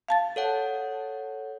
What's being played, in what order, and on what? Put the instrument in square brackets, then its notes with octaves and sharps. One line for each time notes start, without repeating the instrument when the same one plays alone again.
[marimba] F5 A5 A6
[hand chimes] A4 C#5 F#5